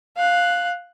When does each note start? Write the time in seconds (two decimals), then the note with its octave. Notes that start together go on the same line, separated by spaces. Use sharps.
0.17 F5 F#6